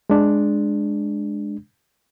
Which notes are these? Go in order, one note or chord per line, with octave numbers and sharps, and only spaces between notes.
G#3 D4